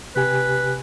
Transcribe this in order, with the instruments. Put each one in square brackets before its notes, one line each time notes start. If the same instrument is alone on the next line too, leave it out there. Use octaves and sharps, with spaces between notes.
[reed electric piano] C3 G4 G#5 [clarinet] B4